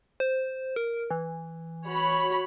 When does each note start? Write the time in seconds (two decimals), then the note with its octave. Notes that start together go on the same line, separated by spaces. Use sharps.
0.20 C5
0.76 A#4
1.11 E3
1.85 F#4 C#5 B5